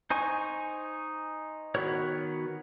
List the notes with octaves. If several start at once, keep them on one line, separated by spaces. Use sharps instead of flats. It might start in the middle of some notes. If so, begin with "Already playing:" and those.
D#4 C5 G#5 C#6
D#3 B3 F#4 A#4 C#5